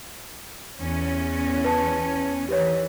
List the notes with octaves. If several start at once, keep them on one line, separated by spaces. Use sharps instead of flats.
E2 B3 C#4
B4 A5
D#3 E3 G4 B4 C#5